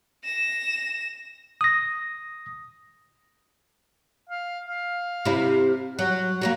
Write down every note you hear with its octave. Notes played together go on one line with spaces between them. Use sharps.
A#6 E7
D#6 A#6
F5
F5
C3 E4
F#3 F#5
F#3 G3 A#3